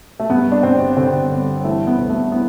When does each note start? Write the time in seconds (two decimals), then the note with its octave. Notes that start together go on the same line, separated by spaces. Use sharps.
0.20 A3
0.30 G2 B3
0.52 D4
0.63 G1 C4
0.97 D3 C4
1.31 G1
1.64 E3 A3
1.87 B3
1.98 D2
2.09 A3
2.32 E3 B3